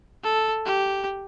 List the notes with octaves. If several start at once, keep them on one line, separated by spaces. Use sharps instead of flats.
A4
G4